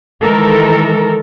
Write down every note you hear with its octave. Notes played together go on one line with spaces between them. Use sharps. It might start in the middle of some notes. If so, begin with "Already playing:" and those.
D#3 E3 G#3 A4 A#4